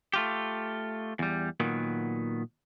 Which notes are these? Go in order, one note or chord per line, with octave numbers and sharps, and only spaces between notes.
A3 F4 G4
E2 G3
A#2 D#3 F#3 B3